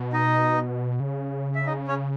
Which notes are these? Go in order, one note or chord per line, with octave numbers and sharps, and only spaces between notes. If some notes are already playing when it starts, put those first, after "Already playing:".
Already playing: B2
D#4 D#5
C#3
E5
D#4 D#5
C#4 C#5